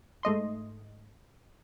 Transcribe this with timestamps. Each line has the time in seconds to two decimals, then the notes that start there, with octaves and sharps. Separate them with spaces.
0.23 G#2 A3 D#5 C6